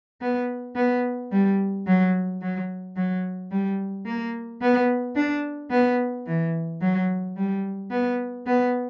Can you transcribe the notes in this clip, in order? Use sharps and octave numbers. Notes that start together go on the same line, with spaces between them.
B3
B3
G3
F#3
F#3
F#3
G3
A#3
B3
D4
B3
E3
F#3
G3
B3
B3